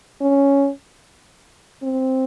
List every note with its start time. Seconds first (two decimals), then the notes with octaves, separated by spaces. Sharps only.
0.21 C#4
1.83 C4